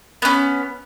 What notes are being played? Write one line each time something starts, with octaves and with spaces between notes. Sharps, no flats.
B3 C#4